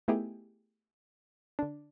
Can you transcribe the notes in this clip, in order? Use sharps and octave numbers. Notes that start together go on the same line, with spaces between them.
A3 B3 D#4 E4 G4 G#4
D3 D4